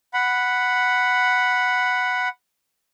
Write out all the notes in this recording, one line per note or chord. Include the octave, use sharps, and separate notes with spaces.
F#5 B5